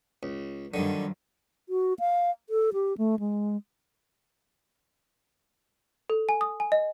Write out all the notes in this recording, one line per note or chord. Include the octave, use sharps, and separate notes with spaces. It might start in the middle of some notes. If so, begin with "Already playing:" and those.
C#2
G2 D3 D#3 F3 F#3
F#4
F5
A4
G4
A3
G#3
A4
G#5
D#6
G#5
D#5